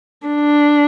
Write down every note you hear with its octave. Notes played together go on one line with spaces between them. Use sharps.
D4